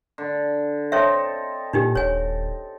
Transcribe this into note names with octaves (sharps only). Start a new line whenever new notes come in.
D3
C4 A4 C#5 D#5 E5
A#2 D4 D#4 G4
D#1 C#5 G#5